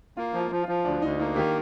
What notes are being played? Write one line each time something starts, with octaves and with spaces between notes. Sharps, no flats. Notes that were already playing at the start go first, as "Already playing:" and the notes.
A#3 F4
F3
F4
F3
F4
F3
D2 D4
D2 D#4
A#3 D#4
D#3 G4